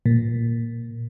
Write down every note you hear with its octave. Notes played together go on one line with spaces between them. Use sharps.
A#2